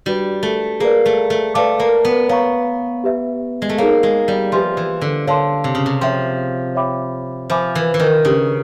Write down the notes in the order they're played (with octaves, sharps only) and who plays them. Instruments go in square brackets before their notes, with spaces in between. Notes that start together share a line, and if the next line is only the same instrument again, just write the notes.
[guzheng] G3 [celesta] D4 F#4 B4
[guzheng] A3
[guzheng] A#3 [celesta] G#4 B4 D5
[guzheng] A3
A3
[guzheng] A3 [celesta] B4 D5 F5 A5 D6
[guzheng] A#3
B3
[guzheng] B3 [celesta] C#5 F5 A#5 C#6
[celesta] G4 B4 E5
[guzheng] G#3
A3
[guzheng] A#3 [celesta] D#4 G#4 C#5 F5
[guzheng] G#3
G3
[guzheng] F3 [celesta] G4 B4 E5 G#5 C6
[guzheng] E3
D3
[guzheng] D3 [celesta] C#5 F5 A5 C6
[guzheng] C3
C#3
C3
[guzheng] F3 [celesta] C#5 E5 G5 C6
[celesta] C#5 E5 G5 B5 D6
[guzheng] F3 [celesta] C5 E5 G#5 B5 D6
[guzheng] E3
E3
D#3
[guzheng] C#3 [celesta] D4 G4 B4